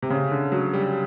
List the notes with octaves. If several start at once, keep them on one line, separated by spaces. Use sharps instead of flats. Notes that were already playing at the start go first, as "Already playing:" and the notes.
C3
C#3
D3
F#3
G3